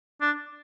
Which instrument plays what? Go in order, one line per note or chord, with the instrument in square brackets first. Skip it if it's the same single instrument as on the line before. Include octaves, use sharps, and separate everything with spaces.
[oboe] D4